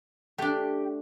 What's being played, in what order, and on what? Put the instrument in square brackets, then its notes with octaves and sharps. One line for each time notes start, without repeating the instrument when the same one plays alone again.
[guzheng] A3 D4 [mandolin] G4